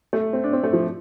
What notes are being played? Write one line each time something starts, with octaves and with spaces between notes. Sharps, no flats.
A3
C4
D4
C4
A3
F3